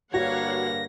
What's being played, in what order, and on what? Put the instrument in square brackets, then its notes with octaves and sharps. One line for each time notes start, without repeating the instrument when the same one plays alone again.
[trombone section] G2 D3 A#3 [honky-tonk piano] F#4 [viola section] C#5 F5 F#5 [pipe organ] A#6